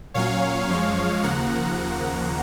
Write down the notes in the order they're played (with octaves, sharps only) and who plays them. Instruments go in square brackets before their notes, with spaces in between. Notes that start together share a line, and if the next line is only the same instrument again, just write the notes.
[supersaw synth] A#2 F#3 C#4 C#5 F5
F#2 F3 G#3
D#2 C#3 F3 A#3 F#5 A#5